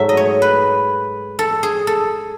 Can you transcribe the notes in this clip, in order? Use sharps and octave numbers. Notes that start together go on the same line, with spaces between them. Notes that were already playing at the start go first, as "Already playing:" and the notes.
Already playing: G#2 F#3 A3 E5
D#5
C#5
B4
A4
G#4
A4